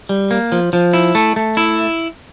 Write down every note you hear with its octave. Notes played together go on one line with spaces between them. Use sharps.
G3
A#3
F3
F3
E4
A3
A3
E4